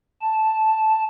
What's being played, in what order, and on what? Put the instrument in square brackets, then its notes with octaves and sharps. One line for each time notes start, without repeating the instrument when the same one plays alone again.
[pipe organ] A5